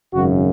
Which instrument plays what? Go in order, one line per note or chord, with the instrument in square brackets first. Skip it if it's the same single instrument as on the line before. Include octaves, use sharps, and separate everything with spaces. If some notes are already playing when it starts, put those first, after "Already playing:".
[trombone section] G#1 F#2 C#3 F#4